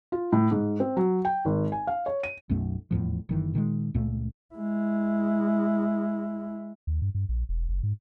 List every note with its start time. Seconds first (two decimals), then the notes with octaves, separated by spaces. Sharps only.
0.12 F4
0.32 A2
0.51 G#2
0.80 C4
0.97 F#3
1.25 G5
1.45 G#1
1.72 G#5
1.87 F5
2.06 C#5
2.23 D#7
2.50 B1 F#2 A3
2.91 D#1 E2 A2 F3
3.29 F#1 D#3 E3
3.53 A#2 D#3 E3 G#3
3.94 C#2 A#2 A3
4.55 G#3 E4
6.87 D#2
7.02 G2
7.15 G2
7.29 A#1
7.49 E1
7.69 F#1
7.83 G#2